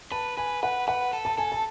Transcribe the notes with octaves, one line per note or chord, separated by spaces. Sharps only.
B4 A5
B4 G#5
B4 F#5
B4 F#5
A4
A5
A4 G#5
A5